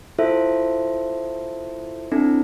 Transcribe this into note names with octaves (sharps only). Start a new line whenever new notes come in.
E4 F4 A4 C5 E5
C4 D4 E4 A4